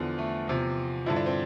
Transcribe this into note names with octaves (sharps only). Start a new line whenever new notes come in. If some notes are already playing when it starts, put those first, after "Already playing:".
Already playing: E2 D3 F3
A3
E2 C3 F3
G2 D3 F3 E4
D4
C4